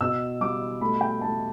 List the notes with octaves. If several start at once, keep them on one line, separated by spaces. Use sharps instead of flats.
B2 E6
G3 D6
A3 B5
G5
A3 A5